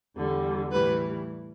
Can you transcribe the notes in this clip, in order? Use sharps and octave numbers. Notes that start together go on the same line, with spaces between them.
E2 D3 G3
A2 E3 G3 B4